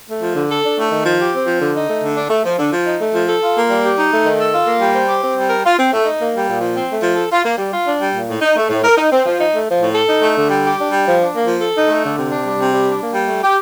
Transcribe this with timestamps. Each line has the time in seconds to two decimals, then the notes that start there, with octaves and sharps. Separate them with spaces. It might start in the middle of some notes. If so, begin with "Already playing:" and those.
0.08 A3
0.22 F3
0.36 D3
0.50 A4
0.64 D4
0.78 A3
0.91 D#3
1.05 F3
1.19 G4
1.33 C4
1.46 F3
1.60 D3
1.75 D#4
1.88 A3
2.02 D3
2.17 D4
2.30 A3
2.44 F3
2.59 D3
2.73 F3
2.85 D#4
3.00 A3
3.13 F3
3.27 A4
3.42 F4
3.56 A#3
3.69 G3
3.83 G4
3.97 D#4
4.12 A3
4.25 D#3
4.39 A4
4.52 F4
4.67 A#3
4.80 G3
4.94 C5
5.08 G4
5.22 C4
5.36 G3
5.49 A#4
5.64 F4
5.77 C4
5.92 A3
6.05 D#4
6.19 A#3
6.34 G3
6.47 A#2
6.61 F3
6.76 C4
6.89 A3
7.03 F3
7.16 A4
7.31 F4
7.45 A#3
7.58 G3
7.72 F4
7.86 D4
8.00 G3
8.13 A#2
8.28 A2
8.42 D#4
8.56 A3
8.69 A2
8.84 A#4
8.97 D#4
9.11 C4
9.26 F3
9.40 D#4
9.53 A3
9.67 F3
9.81 A2
9.95 A4
10.09 D#4
10.22 A3
10.36 D3
10.50 G3
10.64 G4
10.78 D4
10.92 G3
11.06 F3
11.20 D4
11.34 A#3
11.47 F3
11.61 A4
11.75 D#4
11.89 A3
12.03 D3
12.17 C3
12.30 D4
12.44 G3
12.59 C3
12.72 G3
12.86 D4
13.01 A#3
13.14 G3
13.28 A3
13.42 G4